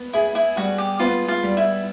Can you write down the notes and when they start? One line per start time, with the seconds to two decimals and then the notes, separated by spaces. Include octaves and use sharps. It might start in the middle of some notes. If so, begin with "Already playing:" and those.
Already playing: B3
0.13 E4 G#4
0.35 E4
0.57 G3 F#4
0.78 G4
0.99 B3 F4
1.28 F4
1.43 G3
1.57 E4